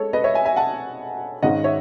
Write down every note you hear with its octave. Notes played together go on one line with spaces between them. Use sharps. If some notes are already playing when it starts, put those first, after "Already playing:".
Already playing: G#3 A4 C#5
B4 D#5
C#5 E5
E5 G#5
E5 G#5
F#5 A5
G#1 G#2 D#3 G#3 C#4 D#5 F#5
C#5 E5